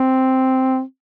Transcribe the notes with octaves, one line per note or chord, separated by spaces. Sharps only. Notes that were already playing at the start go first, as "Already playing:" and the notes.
Already playing: C4